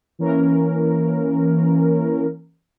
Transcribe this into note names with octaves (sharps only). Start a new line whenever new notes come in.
E3 A#3 C#4 A#4